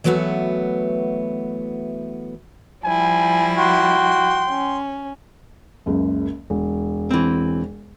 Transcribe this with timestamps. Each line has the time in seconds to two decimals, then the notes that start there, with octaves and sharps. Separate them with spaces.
0.04 E3 F#3 A3 B3 F#4
2.85 F3 G3 E4 G#5
3.57 F#4 G5 C6
4.47 C#4
5.86 F#1 C#2 F#2
6.50 E1
7.11 E3 C4